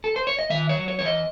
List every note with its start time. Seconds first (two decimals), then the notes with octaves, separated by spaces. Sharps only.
0.04 A4
0.16 C5
0.27 C#5
0.39 D#5
0.50 D#3 E5
0.69 C#5
0.75 F#3
0.88 C#5
0.99 E2 C#5
1.05 D#5